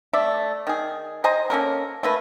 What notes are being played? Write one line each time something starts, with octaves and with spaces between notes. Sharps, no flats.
A3 D5 E5
D#3 G#4
C5 D#5 G#5 A#5
A#3 C#4 A4 A#4
A3 A#3 B4